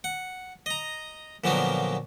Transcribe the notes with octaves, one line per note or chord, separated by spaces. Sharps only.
F#5
D#5 A#5
A#2 D3 F3 F#3 A#3 B3